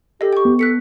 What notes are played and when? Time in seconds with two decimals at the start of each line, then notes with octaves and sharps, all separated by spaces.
0.21 G4 A4 D#5
0.33 G5 C#6
0.45 B3
0.59 A4 F#6 B6 C#7